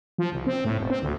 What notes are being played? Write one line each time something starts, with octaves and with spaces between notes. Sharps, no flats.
F3
C2
C4
A2
E1
C4
D2